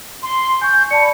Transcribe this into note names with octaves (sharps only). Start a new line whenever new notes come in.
C6
G#5 C#6 G6
D5 A5 B5 C#7